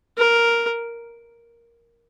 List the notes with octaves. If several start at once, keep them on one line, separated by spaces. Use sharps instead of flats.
A#4